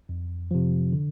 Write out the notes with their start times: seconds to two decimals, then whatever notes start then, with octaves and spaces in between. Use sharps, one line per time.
0.09 F2
0.51 C3 F3
0.92 D3